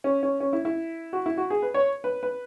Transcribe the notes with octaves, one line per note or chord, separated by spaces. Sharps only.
C#4
C#4
C#4
E4
E4
F#4
E4
F#4
G#4
B4
C#5
B4
B4